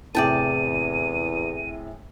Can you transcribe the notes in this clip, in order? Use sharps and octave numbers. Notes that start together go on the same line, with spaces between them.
E2 A2 C3 G#4 D5 G5 A5 D#7